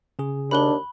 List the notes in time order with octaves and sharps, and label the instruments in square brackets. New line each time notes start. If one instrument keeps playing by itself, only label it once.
[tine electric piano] C#3 G#4
[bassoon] D#2 [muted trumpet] D4 [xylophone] B5 F#6 G7